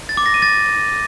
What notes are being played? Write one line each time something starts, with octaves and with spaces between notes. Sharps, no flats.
A6
D6
A#6
D#7
A6